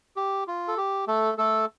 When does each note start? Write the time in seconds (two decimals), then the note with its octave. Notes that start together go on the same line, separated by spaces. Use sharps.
0.16 G4
0.47 F4
0.68 A4
0.77 G4
1.07 A3 A4
1.38 A3 A4